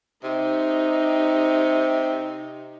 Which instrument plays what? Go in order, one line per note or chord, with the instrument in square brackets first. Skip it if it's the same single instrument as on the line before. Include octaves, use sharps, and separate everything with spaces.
[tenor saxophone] C3 [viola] D#4